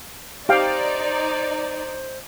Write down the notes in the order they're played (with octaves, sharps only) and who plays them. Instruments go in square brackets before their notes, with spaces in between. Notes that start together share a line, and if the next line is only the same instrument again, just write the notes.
[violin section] D#4 D5 [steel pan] G4 F5 G5 [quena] C5